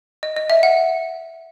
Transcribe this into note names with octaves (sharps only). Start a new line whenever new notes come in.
D#5
D#5
E5
F#5